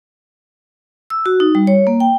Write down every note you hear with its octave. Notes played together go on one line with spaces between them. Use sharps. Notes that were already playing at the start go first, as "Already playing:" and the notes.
E6
F#4
D#4
G3
C#5
A#3
G5